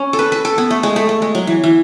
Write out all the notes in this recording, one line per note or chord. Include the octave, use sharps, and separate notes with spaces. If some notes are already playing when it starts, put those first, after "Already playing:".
Already playing: C#4
A4
B4
B4
A4
B3
A3
G#3
A3
A3
G#3
F#3
E3
E3